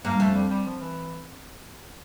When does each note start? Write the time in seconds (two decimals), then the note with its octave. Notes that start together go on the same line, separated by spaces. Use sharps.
0.05 G2 A#3
0.20 F2 A3
0.35 G3
0.50 G3
0.66 F3
0.81 E3